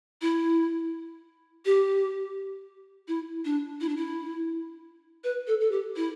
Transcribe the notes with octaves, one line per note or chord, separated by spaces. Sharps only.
E4
G4
E4
D4
E4
D4
E4
B4
A4
A4
G4
E4